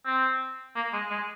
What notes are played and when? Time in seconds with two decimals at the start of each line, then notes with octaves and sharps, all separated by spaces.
0.05 C4
0.76 A#3
0.93 G#3
1.10 G#3